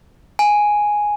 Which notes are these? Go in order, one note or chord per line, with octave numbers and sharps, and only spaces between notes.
G#5